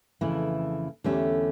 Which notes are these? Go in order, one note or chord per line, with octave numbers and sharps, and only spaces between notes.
F2 C#3 E3 A3 E4
E2 D3 A3 C#4 G4